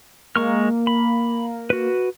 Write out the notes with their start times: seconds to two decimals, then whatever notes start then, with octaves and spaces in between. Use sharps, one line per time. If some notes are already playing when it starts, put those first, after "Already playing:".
0.36 G#3 A#3 C#6 F6
0.87 B5
1.70 F#4 B4